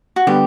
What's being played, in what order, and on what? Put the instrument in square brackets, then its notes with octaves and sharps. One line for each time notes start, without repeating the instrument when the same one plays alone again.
[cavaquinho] F#4
[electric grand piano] D3 G3 B3 [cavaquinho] G4